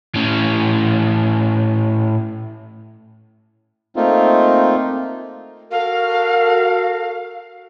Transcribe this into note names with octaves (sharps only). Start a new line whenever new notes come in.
A2 C#4
A3 A#3 C4 D#4 F4
F#4 A4 A#4 F5